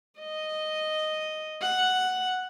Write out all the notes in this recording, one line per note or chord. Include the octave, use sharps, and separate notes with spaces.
D#5
F#5